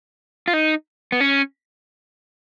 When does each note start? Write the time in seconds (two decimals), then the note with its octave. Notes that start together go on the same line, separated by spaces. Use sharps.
0.48 F4
0.53 D#4
1.12 B3
1.21 C#4